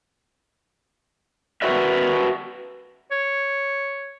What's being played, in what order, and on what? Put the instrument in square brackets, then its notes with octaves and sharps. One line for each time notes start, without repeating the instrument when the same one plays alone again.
[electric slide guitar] F#4 A#4 B4 D5 E5
[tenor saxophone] C#5